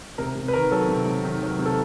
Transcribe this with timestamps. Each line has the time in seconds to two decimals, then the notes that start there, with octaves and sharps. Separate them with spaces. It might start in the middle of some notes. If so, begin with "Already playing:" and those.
0.18 C3 A#4
0.35 C3
0.48 B4
0.53 D#3 A#4
0.71 F#3 A4
0.89 C3
1.06 C3
1.24 D#3
1.42 F#3
1.59 C3
1.66 A4